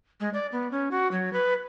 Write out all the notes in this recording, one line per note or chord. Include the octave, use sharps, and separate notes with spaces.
G#3
D5
B3
C#4
F#4
F#3
B4